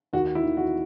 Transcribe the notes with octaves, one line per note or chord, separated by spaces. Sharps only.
D#2 F#4
E4
D#3
F#4